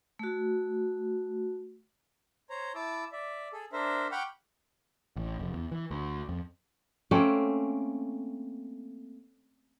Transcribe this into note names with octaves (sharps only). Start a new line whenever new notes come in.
A3 F#4
C5 C#5 A#5
E4 A5 D6 E6
D5 E5
G#4 A4
D4 A#4 C5 E5
F#5 G5 B5 C#6 D6 F6
A1
F1
E2
E3
D2
F2
A3 A#3 C4 C#4